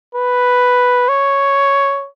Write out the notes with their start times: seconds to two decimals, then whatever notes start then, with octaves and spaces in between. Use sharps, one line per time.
0.15 B4
1.09 C#5